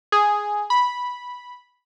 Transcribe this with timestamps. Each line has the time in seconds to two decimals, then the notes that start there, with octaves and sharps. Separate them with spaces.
0.12 G#4
0.70 B5